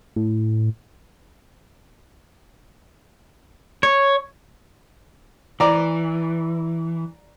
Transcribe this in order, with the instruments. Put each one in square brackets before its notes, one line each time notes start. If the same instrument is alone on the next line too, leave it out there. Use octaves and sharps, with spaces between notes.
[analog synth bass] A2
[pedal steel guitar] C#5
[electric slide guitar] E3 [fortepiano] D5 A#5